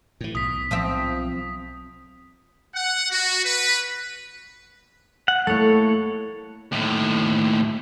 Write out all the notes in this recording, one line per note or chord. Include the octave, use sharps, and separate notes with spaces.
A2 E3
B1 D#6 B6
F3 C4 E5
F#5
F#4
B4
F#5
A3 A#3 E4 A4 C#5
D#2 A2